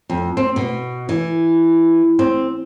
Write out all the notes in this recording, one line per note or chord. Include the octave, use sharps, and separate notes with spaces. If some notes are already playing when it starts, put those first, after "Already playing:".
F2
C4
B2
E3
C4